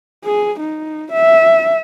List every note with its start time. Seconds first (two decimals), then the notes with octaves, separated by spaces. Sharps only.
0.25 G#4
0.60 D#4
1.12 E5